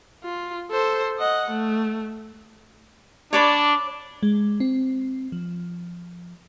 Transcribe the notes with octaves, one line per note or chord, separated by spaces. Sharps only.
F4
A4 C5
D#5 F#5
A3
D4 C#5 D5 B5
G#3
C4
F3